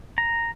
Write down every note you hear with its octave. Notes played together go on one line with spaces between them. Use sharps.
A#5